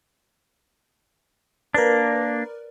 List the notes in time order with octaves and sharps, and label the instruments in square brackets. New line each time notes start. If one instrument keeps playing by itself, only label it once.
[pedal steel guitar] A#3 D4 [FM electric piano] A#4 B4 D5